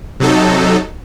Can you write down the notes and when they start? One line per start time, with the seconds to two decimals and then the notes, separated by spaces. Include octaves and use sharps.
0.20 C3 F#3 D#4 A4